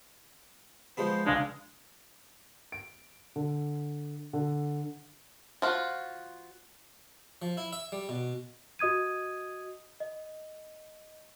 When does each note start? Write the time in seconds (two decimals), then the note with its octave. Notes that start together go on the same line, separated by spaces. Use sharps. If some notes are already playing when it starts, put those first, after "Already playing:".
0.97 F3 G#3 B3 C5
1.26 C#2 G#3 D4 F5
2.72 D7
3.36 D3
4.33 D3
5.62 F3 F4 F#4
7.42 F3
7.57 E4
7.73 E5
7.92 G3
8.09 B2
8.79 F#4 D#5 D#6 G#6 D#7
10.00 D#5